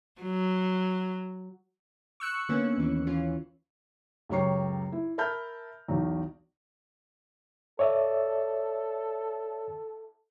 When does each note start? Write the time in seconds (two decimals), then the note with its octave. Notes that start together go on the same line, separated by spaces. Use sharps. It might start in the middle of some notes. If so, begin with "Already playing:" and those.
0.21 F#3
2.20 C#6 E6 F#6 C#7
2.49 D3 A#3 B3 C#4
2.77 D#2 E3
3.07 E3 C#4 F4
4.29 C#2 F#2 G4 C#5 C#6 C7
4.92 E4
5.18 A#4 E5 A5 B5 F6 G6
5.88 B1 E2
7.79 A4 C#5 D5 E5